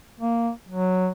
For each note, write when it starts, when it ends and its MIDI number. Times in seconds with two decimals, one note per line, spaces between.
0.20 0.51 58
0.69 1.10 54